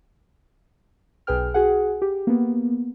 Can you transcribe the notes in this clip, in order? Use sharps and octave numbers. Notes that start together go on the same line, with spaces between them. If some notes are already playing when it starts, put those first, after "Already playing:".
B1 G#4 B4 G5 F6
F#4 G#4 F#5
G4
A#3 B3